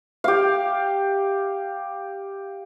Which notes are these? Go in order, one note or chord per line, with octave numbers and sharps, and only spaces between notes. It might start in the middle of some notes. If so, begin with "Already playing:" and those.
G4 F5